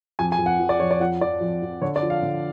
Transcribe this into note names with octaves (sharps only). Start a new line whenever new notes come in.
F2 G#5
G#5
F2
F#5
F3
D5
F2 C#5
D5
F3 F#5
F3 D5
F2
F2
D3 C#5
D5
F3
F5
D3